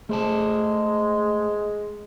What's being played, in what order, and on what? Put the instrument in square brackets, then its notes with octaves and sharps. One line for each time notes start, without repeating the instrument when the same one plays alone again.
[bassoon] G#3 [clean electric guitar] A3 C5 A5